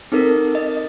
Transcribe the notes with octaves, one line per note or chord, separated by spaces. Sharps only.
C4 D#4 A4 A#4
D#5